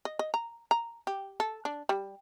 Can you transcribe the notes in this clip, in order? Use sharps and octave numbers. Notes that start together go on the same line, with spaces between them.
D#5
D#5
A#5
A#5
G4
A4
D4
G3